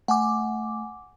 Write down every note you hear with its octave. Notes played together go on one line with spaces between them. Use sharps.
A3 F#5 G#5 D6